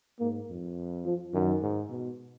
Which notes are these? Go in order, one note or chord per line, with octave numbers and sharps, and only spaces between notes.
G#2 A#3
F2
F3
F#2 D#3
G#2
B2